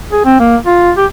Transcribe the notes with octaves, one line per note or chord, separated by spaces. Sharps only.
G#4
C4
A#3
F4
G4